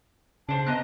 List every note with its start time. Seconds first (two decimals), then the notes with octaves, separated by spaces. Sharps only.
0.49 C#3 D4 C5 A5
0.66 B3 D#5 A#5 F#6